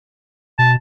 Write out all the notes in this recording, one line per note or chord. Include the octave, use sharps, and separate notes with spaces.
B2 A5